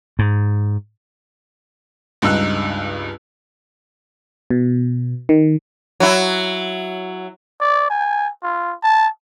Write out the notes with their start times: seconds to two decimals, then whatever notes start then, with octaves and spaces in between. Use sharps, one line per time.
0.19 G#2
2.22 C#2 G2 D#4 E6 F#6
4.50 B2
5.29 D#3
6.00 F#3 E4
7.60 D5
7.90 G#5
8.43 F4
8.83 A5